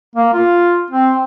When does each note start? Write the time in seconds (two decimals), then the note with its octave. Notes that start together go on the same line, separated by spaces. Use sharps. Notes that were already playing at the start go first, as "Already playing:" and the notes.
0.16 A#3
0.34 F4
0.91 C4